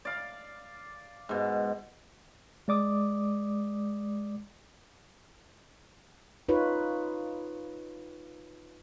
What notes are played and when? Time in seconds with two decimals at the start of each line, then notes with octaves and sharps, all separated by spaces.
0.05 D5 F5
1.29 G#2 B2
2.68 G#3 D5 D6 D#6
6.49 D#4 F4 B4 C#5